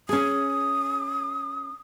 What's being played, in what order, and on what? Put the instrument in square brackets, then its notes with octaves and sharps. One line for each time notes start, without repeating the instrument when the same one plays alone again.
[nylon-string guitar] C#4 G#4 [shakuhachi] D#6